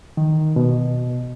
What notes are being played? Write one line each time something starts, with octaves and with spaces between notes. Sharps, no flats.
D#3
B2